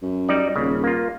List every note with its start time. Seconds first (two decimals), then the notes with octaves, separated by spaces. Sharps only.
0.02 F#2
0.29 G3 D#4 D5
0.56 D#1 C#3
0.84 A#3 F4